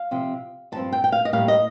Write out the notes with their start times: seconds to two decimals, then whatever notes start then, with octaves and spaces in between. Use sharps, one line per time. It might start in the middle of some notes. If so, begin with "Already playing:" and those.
Already playing: F5
0.11 C3 F3 C4
0.72 G2 F3 C4 A5
0.92 G5
1.04 G5
1.12 F5
1.25 D#5
1.33 A2 G3 A#3 F5
1.48 D#5